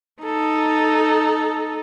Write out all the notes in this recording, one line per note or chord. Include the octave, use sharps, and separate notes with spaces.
D#4 A4